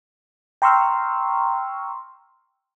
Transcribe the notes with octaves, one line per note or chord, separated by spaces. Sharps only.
G5 A#5 C6 C#6 E6 F6